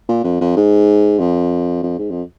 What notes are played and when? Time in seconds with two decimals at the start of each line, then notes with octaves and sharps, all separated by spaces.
0.09 A#2
0.24 F2
0.41 F2
0.57 G#2
1.19 F2
1.83 F2
1.99 G#2
2.10 F2